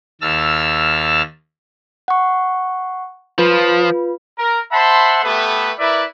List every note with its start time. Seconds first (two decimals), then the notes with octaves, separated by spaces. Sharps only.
0.21 D#2 A5 E6 F6
2.08 F#5 C#6
3.38 F3 F4 B4
4.38 A#4
4.72 C5 E5 F#5 A5 B5 C6
5.23 A3 B3 G4 A4 B4 E5
5.79 E4 A#4 B4 D5 E5